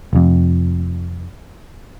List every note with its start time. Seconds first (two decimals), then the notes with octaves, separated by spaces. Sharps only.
0.13 F1 F2